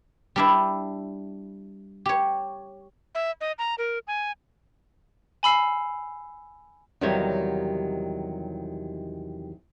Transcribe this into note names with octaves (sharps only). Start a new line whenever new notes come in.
G3 D4 E4
G4 C#5
E5
D#5
A#5
A#4
G#5
G#5 B5 E6 C7
E2 C3 D#3 F#3 G3 C#5